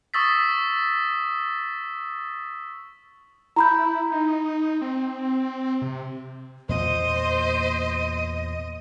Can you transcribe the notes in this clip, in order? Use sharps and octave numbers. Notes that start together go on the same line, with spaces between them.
C#6 D#6 E6 A6 B6
E4 A#5 B5 G6
D#4
C4
C3
E2 A#2 A#3 C5 D#5